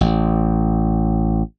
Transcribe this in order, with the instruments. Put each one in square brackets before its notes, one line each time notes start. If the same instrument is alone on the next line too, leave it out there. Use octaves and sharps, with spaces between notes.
[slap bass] A1